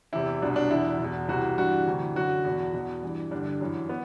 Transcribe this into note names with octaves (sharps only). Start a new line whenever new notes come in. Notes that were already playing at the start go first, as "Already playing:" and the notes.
E2 C3 E3 E4
C2 B2 D4
D4
E2 B2 E4
E2 B2
C2 C3 E3 F#4
G2 E3 F#4
D2 C3 E3
F#2 D3 F#4
E2 B2
E2 B2
G2 E3
G2 D3 D4
F#2 E3
B3